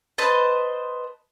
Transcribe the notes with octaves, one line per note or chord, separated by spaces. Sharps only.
B4 C5 D#5 A5